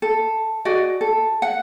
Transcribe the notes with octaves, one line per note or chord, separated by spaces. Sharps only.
A4
F#4 G#4 D5 D#5
A4
F#5